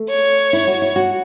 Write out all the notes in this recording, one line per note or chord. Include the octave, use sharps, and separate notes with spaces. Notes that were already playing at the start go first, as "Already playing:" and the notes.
Already playing: A3
C#5
E4
F#4
E4
F#4